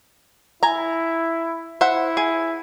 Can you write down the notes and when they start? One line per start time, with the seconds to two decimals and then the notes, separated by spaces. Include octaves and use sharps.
0.63 E4 G#5 A#5
1.81 E4 C5 E5 F#5
2.17 G#4